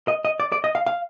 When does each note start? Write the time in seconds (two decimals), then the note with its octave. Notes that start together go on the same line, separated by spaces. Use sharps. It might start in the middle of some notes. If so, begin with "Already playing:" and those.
0.08 D#5
0.25 D#5
0.40 D5
0.52 D5
0.64 D#5
0.75 F5
0.86 F5